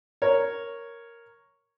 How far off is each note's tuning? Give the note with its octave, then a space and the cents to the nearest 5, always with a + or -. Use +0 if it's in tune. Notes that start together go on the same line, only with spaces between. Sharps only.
A#4 +0 C#5 +0